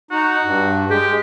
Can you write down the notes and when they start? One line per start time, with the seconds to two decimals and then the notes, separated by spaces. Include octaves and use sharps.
0.11 D#4 F#4
0.44 G2
0.90 G#3 G4 G#4